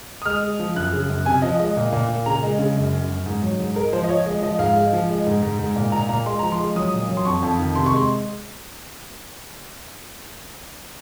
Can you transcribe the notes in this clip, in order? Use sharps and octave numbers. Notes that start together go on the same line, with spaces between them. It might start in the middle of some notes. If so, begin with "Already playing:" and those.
D#6
G#3 F6
G#3
F3
F#2 F#6
C#3
F#2
C3 G#5
F3 D#5
G#3 D#5
A#2
A#2
A#2
C#3 A#5
G#3
C#3
F#2
F#2
F#2
G#2
F#3
G#2
G#3 A#4
F3 C5
D#5
F3 C#5
G#3 D#5
F3 D#5
G#2 F5
G#3
F3
G#3
G#2
G#2
G#2
A#2
A#2 A#5
A#2 A#5
G#3 C6
F3 A#5
C6
G#3
F#3 D#6
A#2
F#3
C6
F2 C#6
F2
D#3
C3 C6
C#6
G#3 C6